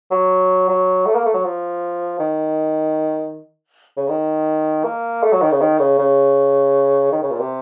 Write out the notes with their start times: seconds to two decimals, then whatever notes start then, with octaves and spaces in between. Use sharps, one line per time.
0.11 F#3
0.69 F#3
1.06 A3
1.15 A#3
1.25 A3
1.34 F#3
1.44 F3
2.19 D#3
3.97 C#3
4.09 D#3
4.84 A#3
5.23 A3
5.32 F#3
5.42 D#3
5.51 C#3
5.61 D#3
5.79 C#3
5.99 C#3
7.12 D#3
7.22 C#3
7.31 A#2
7.40 C3